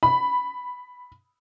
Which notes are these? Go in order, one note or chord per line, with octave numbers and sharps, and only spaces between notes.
B5